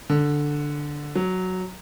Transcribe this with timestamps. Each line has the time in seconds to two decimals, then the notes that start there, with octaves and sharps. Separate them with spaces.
0.10 D3
1.16 F#3